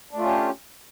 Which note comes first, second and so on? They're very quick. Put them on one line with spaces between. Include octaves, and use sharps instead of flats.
D4 A3 F4 C#4 G4